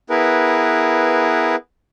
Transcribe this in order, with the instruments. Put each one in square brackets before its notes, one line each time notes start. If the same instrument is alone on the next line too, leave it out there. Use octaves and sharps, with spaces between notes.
[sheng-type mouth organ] B3 E4 G#4 A#4 B4